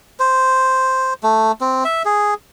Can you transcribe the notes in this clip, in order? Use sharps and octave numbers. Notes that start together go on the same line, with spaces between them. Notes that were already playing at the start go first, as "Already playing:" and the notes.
C5
A3
C4
E5
G#4